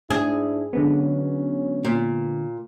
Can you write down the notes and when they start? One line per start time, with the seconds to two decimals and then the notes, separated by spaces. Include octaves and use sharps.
0.10 G#2 D4 E4 G#4
0.73 D3 F#3 G#3 B3 C#4
1.85 A#2